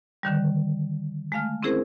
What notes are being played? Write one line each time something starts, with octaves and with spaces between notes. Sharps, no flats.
D3 D#3 G3
G#3 A3 F5 F6
C4 C#4 E4 G#4 A#4 C5